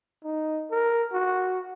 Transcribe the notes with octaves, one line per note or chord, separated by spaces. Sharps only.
D#4
A#4
F#4